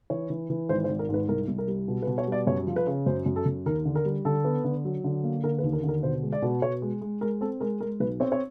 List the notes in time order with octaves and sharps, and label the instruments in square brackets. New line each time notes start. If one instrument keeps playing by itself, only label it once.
[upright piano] E3 C#5
E3
E3
G#1 C5
C5
G#1
A#4
G#2
B4
C2 A#4
C2
A#4
G3
B2
B4
B2
C#5
G3 D5
F#2 C#5
F3
B4
C#3
F#2 C5
F#2
A4
F#2
D#2 A#4
D3
A#4
G3
D3 A4
B3
D3
F#3
D3
A#3
D3 A#4
B4
D#2
A#4
D3
A#4
B2 C5
G#3
D5
B2
B2 C#5
G#3
G#3
G#3 A#4
C4 A4
G#3 A#4
G#3 A#4
B1 B4
C4 C#5
C#5